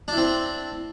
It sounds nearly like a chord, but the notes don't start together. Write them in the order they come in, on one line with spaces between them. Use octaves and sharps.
D4 E4 C4